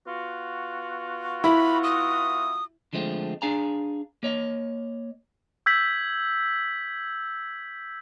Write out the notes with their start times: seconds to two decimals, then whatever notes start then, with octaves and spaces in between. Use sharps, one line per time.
0.06 B3 F4 F#4
1.44 E4 B5
1.84 D#6
2.93 D3 F3 G#3 A3 C4
3.42 D4 G#4 F5 G#5 A#5
4.23 A#3 C#5 D#5
5.66 E6 G6 G#6 B6 F#7